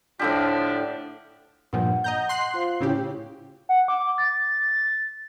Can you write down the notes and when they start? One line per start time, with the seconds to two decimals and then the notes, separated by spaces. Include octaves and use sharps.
0.19 A2 D3 F3 D4 G4
1.73 G2 A#2 F3 F#5
2.04 D#5 A#5 G6
2.29 C6 F#6 C7
2.54 F4 C5 F5
2.80 A2 C#3 C#4 E4 G4 C#5
3.69 F#5
3.88 D6
4.18 A6